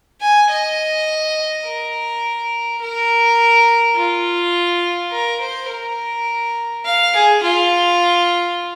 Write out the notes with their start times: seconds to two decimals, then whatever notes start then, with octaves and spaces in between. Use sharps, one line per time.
0.21 G#5
0.50 D#5
1.65 A#4
2.81 A#4
3.96 F4
5.12 A#4
5.41 C5
5.69 A#4
6.85 F5
7.14 G#4
7.43 F4